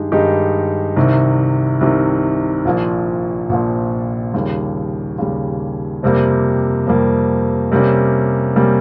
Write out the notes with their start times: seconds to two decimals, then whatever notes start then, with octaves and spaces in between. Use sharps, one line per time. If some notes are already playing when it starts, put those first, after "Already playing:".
Already playing: G2 D#3 G#3 D#4 G4
0.12 G2 D#3 G#3 D#4 G4
0.97 C2 C3 D#3
1.81 C2 C3 D#3
2.65 A#1 A#2 F3
3.49 A#1 A#2 F3
4.34 D#2 C#3 G3
5.19 D#2 C#3 G3
6.03 F2 C3 G3 A#3
6.87 F2 C3 G3 A#3
7.72 C3 G3 A#3 C#4
8.56 C3 G3 A#3 C#4